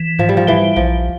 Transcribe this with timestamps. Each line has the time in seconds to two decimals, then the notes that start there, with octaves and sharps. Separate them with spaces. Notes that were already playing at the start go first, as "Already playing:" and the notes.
Already playing: E3
0.19 G#2 F3
0.29 G3
0.37 F3
0.47 E3 G3
0.76 A#1 F3